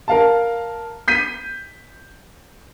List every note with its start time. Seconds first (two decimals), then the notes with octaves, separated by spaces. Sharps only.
0.08 A#4 F5 A5
1.08 G6 B6 D#7